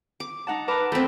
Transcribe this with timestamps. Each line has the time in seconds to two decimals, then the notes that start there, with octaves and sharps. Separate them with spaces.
0.20 D6
0.47 D#4 F#5 A5
0.68 A#4 B4 A5 D6
0.92 A3 C4 B5